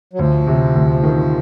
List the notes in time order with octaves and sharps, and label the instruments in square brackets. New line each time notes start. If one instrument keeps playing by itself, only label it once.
[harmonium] F#3
[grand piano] D2 [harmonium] F3
[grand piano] C3
D2
D#3